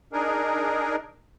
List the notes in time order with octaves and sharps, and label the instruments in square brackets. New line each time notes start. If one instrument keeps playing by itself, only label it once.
[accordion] D4 D#4 G#4 A#4